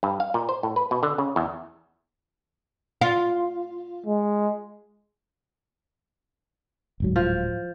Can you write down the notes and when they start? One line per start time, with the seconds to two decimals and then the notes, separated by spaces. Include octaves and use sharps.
0.03 G2
0.20 F5
0.34 A#2
0.49 C5
0.63 A2
0.76 B4
0.91 B2
1.03 D3
1.18 C#3
1.36 E2
3.01 F4
4.06 G#3
7.00 D1 G#2 F#3
7.16 F3